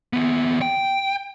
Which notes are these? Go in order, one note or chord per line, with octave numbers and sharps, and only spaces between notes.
D#2 B3
G5